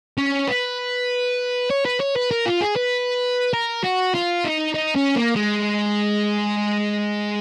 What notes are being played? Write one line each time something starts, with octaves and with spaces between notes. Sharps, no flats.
C#4
B4
C#5
B4
C#5
B4
A#4
F4
G#4
B4
A#4
F#4
F4
D#4
D#4
C#4
A#3
G#3